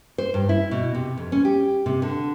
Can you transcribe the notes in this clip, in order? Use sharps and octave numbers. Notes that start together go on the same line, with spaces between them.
C5
G2
E4
B2
C3
F2
C#4
G4
C3
D3